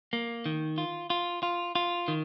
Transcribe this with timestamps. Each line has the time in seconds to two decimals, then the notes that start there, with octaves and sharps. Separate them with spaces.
0.13 A#3
0.46 D#3
0.78 F4
1.10 F4
1.43 F4
1.75 F4
2.08 D#3